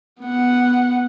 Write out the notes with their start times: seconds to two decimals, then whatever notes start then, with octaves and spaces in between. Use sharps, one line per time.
0.22 B3 F#5